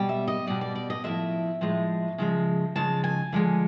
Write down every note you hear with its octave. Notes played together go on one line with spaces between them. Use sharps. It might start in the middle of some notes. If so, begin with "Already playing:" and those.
Already playing: B2 G3
E5
D#5
B2 G3 D5
D5
D5
D#5
A2 F3 G#3 E5
A2 F3 G#3
C#3 F3 G#3
C#3 F3 G#3 A5
G#5
D3 F3 G#3